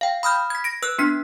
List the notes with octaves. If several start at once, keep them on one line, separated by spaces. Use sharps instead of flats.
F5 G5
B5 D#6 F6 G6
G#6 B6
A#6 D7
B4 E6 F#6
B3 D4 B6